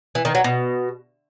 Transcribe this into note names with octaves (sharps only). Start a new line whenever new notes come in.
E3
D#3
F#3
B2